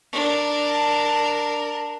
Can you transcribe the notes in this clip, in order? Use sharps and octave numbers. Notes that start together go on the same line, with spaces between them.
D4 A#4